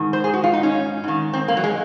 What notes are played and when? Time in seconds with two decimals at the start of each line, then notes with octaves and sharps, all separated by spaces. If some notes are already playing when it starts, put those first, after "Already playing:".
Already playing: G#2 D#3
0.13 C5
0.24 G#4
0.33 F#4
0.44 F4
0.53 D#4
0.63 C#4
1.04 G#2 D#3
1.33 C4
1.48 A#3
1.57 F#3
1.64 G#3